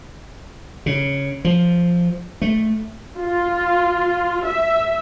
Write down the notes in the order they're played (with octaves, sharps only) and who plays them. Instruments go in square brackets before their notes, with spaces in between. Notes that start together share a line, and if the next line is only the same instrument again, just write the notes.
[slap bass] C#3
F3
A3
[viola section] F4
E5